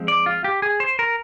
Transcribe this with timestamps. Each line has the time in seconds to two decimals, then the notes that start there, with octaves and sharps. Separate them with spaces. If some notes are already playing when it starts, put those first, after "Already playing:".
Already playing: F3 G#3 C4
0.08 D5
0.26 F4
0.44 G4
0.62 G#4
0.80 C5
0.99 A#4